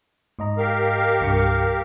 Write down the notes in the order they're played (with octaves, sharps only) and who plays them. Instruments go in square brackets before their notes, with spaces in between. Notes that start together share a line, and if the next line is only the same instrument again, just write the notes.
[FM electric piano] G#2 D#5 A#5
[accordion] G4 A#4 F5
[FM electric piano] C2 G2 C#7